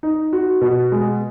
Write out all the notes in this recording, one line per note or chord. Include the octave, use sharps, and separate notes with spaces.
D#4
F#4
B2
G#3